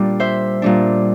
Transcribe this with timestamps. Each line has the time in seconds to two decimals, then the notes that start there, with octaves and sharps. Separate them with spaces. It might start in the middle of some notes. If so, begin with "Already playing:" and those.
Already playing: A#2 G3 D4
0.20 C5 E5
0.62 A#2 G3 D4